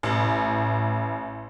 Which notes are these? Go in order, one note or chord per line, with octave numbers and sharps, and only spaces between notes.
A1